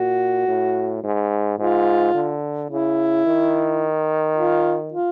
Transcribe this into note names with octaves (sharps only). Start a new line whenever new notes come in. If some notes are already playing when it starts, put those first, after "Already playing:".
Already playing: A#2 F#4
A2
G#2
G#2 F4
D3
C#3 E4
D#3
F4
F4